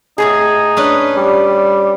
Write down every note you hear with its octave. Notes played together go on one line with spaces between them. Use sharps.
A2 C#3 D#4 G#4
C#4 D4 B4
G3 D5